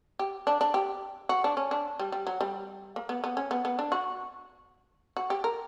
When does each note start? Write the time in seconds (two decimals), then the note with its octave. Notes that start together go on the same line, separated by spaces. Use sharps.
0.19 G4
0.47 D4
0.61 D4
0.74 G4
1.29 F#4
1.44 D4
1.57 C#4
1.71 D4
2.00 G3
2.12 G3
2.27 F#3
2.41 G3
2.96 A#3
3.09 B3
3.24 B3
3.37 C#4
3.51 B3
3.65 B3
3.79 D4
3.92 F#4
5.17 F#4
5.30 G4
5.44 A#4